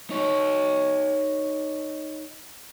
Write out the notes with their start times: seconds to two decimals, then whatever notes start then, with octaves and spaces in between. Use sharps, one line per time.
0.10 D#4 C#5